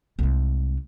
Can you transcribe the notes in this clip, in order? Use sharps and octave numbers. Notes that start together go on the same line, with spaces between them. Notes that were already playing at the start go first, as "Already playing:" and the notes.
C2 G#3